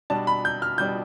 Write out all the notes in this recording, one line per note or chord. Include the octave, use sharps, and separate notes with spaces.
B2 G3 D4 A5
B5
G6
F6
B2 G3 D4 G6